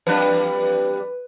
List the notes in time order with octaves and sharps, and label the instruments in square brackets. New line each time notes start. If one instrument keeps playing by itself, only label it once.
[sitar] E2 G3 D4 [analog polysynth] B4